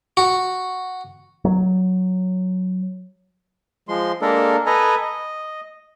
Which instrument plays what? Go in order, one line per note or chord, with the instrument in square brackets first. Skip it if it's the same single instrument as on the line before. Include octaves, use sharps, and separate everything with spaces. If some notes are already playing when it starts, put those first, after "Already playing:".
[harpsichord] F#4
[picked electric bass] F#3
[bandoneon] F3 G#3 C6
G#3 A#3 D4 A4 A#4
A4 B4 D#5 G#5 A#5
D#5